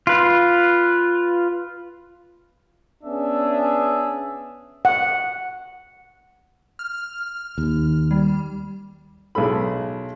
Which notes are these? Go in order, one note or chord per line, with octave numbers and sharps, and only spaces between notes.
F4 B4
B3 C#4 D4 G#4 E5
F#5
F6
D#2
G3
B1 G#3 A4 B5